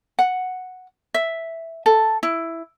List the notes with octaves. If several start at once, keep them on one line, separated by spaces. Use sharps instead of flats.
F#5
E5
A4
E4